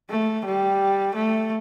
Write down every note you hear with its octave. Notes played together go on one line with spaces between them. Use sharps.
A3
G3
A3